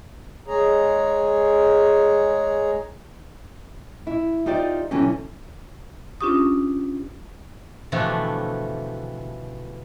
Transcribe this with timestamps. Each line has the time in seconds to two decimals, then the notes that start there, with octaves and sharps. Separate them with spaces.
0.47 G#3 G#4 C#5 A#5
4.07 E4
4.46 D#4 F4 G4 C5 D5
4.91 B2 D3 E3 F#3 C4 C#4
6.21 C#4 D4 F4 G4 C#6 D#6
7.92 B2 D3 E3 F3 A3 G4